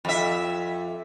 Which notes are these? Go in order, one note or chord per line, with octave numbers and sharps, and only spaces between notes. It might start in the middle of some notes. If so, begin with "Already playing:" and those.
F2 E5